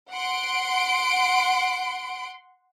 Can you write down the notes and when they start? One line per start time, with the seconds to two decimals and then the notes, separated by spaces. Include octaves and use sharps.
0.12 F#5 C6 D7